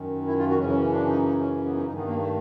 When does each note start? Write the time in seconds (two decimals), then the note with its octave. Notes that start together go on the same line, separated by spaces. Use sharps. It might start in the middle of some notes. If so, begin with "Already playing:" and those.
Already playing: F#2 D#3
0.26 E4
0.37 F4
0.48 F#4
0.58 F#2 C#3 E3 C#4
0.69 C#4
0.79 C#4
0.91 D4
1.06 D#4
1.22 D#4
1.38 C#4
1.65 B3
1.74 D#4
1.86 G2 D#3 D#4
1.96 B3
2.07 A#3
2.18 A3